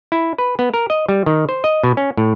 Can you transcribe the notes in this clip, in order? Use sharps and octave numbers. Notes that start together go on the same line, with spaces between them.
E4
B4
B3
A#4
D#5
G3
D#3
C5
D#5
B2
C#4
A2